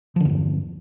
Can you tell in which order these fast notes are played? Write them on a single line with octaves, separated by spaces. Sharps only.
F3 D3 E2 G2